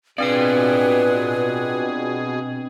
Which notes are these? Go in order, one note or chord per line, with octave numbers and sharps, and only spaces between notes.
B2 C4 D4 F4 G#4 B4 D5 G5